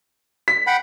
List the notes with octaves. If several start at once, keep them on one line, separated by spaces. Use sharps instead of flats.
B6
F#5 G5 B5